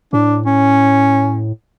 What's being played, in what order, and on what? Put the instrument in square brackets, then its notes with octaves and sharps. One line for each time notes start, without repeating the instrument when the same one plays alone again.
[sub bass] A2 [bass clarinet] D4
[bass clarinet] C#4